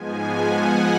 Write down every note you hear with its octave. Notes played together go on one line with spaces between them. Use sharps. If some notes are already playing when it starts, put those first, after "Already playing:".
Already playing: G#2 F3 G#3 B3 G#5
F#5